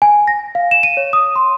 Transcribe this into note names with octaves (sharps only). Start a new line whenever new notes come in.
G#5
A#6
F5
E7
D#7
C#5
D#6
C6